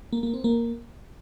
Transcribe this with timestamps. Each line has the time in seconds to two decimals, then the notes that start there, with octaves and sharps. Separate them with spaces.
0.13 A#3
0.23 A#3
0.34 C4
0.44 A#3